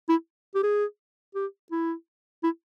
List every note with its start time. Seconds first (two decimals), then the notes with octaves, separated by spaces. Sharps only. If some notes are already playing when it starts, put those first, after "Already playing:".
0.09 E4
0.55 G4
0.63 G#4
1.35 G4
1.72 E4
2.44 E4